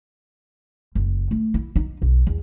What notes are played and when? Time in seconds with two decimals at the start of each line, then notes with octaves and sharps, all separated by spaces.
0.95 F#1
1.31 A3
1.54 E4
1.76 D#4
2.02 B1
2.27 E2